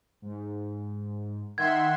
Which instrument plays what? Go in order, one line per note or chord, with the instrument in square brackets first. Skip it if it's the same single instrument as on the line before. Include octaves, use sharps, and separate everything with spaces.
[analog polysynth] G#2
[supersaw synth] D#3 E5 C6 [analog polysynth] F#5 [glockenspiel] G#6